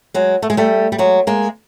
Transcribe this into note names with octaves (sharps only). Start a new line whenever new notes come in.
F#3 G#3
A3
G#3
G3 A3
G3
F#3 G#3
G#3 A#3